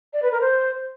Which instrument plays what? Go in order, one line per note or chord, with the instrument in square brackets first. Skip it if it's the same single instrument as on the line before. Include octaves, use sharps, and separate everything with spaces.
[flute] D5
B4
A#4
C5